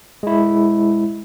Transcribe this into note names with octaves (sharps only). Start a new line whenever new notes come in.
G#3 E4